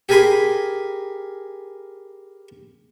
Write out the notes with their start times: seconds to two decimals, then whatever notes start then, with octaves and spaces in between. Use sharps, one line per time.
0.09 G4 G#4 A#4 G#5 B5 C6